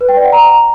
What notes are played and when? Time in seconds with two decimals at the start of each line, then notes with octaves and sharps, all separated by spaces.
0.01 B4
0.09 G5
0.17 D5
0.25 F#5
0.32 A#5